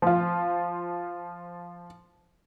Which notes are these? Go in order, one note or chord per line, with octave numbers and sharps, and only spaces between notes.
F3 F4